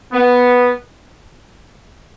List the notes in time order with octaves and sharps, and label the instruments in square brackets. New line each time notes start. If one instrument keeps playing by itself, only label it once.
[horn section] B3